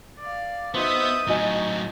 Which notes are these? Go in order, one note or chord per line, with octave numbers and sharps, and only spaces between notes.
D5 F5
B3 D#4 F#4 C5 E5 D#6 G6
A2 F#3 D#4 F#4 D#5 G#5